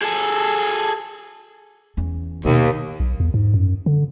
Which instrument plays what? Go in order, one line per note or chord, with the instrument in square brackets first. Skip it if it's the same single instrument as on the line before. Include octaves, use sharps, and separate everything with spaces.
[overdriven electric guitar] G#4 A4
[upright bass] E2 C#4
[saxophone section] D#2 [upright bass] B2 B3
[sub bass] B1
E2
G#2
F#2
D3